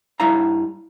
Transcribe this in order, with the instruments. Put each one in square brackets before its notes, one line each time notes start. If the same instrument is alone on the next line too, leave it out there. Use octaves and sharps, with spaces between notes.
[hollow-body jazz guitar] G2 D#4 E4 C#5 F5 A#5